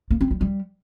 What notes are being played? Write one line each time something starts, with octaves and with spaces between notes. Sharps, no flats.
A#3
C4
G3
G3